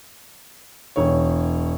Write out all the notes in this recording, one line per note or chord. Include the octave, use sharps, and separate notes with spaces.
E1 C#5